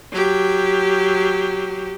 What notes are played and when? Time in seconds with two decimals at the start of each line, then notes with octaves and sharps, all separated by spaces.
0.12 F#3 G4